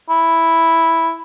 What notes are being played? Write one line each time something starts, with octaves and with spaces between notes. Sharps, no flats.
E4